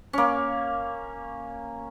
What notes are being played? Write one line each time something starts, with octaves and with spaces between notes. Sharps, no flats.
A#3 C#4